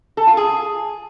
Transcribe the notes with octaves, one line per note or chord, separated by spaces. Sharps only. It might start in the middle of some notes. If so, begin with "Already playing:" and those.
A4
F4
G#4